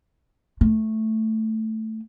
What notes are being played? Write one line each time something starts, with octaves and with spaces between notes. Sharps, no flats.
A3